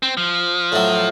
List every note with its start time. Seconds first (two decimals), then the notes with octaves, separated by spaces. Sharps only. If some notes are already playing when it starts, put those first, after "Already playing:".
0.03 C4
0.17 F3
0.72 A2 F#3